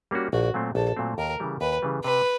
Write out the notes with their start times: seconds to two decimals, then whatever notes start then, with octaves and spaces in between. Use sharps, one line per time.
0.11 G3 A#3 C#4 F#4
0.33 A#1 F#4
0.54 A#2 F#3 A3 C4
0.75 A#1 A4
0.97 A#2 F#3 A3 C4
1.18 D#2 A#4
1.40 C#3 E3 G3
1.61 D#2 B4
1.82 C#3 E3 G3
2.04 C3 B4